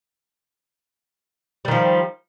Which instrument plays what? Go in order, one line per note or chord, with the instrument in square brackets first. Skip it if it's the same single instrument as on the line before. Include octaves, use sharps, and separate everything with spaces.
[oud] G3
D#3
F3